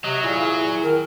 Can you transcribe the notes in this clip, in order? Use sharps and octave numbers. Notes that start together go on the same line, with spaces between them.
C3 F#3 D#5
A#2 E4 G#4 F5
E4 G#4
D#3 A#4